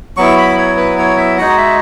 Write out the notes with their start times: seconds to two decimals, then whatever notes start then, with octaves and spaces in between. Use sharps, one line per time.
0.17 F#3 B3 E4 C#6
0.37 B5
0.58 C#5
0.77 B4
0.98 C#5
1.17 E5
1.38 G#3 D#4 F#4 F#5
1.57 E5